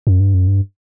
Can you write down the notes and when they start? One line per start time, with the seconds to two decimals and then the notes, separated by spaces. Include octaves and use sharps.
0.07 F#2
0.20 G2
0.34 F#2
0.47 G2